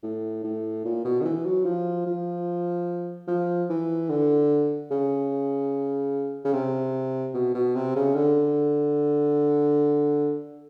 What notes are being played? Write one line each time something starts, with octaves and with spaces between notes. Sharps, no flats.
A2
A2
A#2
B2
D#3
E3
F#3
F3
F3
F3
E3
D3
C#3
C#3
C3
B2
B2
C3
C#3
D3